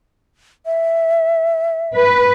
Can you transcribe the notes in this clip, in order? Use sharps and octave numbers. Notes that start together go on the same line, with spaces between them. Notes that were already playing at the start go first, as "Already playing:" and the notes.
E5
B4